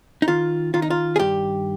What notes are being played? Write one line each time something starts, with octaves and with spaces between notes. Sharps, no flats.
D#4
D#3 F4
D#3 F4
D#4
F4
G#4
G2 G4